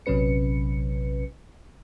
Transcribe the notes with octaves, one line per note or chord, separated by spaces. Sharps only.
A#1 C3 F#3 C#4 B4 C#7